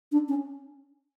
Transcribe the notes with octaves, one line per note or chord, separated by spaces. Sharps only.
D4
C#4